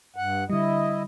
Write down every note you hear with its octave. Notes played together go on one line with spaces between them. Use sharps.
G2 F#5
D3 G3 E4 D#5